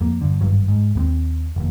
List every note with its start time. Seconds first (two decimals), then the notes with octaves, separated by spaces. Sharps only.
0.01 F2 A#3
0.21 G2 D3
0.41 G#1 G2 F#3
0.68 G#2
0.95 D#2 B3 C4
1.56 F1 D#2